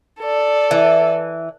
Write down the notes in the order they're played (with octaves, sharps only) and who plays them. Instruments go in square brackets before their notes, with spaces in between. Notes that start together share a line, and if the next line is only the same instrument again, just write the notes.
[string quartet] A4 D5
[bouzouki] E3